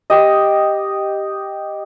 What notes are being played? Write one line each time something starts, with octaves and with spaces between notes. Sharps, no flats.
G4 D#5